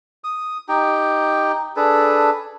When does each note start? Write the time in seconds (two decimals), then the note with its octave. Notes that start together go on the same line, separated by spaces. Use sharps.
0.24 D#6
0.69 D#4 G4 G5
1.77 D4 G#4 A4 B4